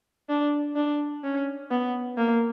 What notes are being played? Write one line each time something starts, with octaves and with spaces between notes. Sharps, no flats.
D4
D4
C#4
B3
A#3